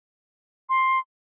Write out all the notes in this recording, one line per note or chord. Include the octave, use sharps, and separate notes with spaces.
C6